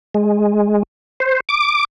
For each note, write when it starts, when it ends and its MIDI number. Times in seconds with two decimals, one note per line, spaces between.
0.15 0.83 56
1.20 1.40 72
1.49 1.85 86